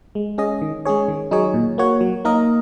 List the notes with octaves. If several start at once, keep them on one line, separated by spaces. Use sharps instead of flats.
G#3
C#4 G#4 D#5
D#3
G#3 C#4 G#4 C#5
D#3
F#3 D#4 G#4 C#5
A#2
A#3 F#4 C#5
F#3
A#3 D#4 A#4 D#5